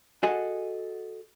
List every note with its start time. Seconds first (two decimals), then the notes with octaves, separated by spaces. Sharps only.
0.23 F#4 G#4 A4 D#5 F#5 G#5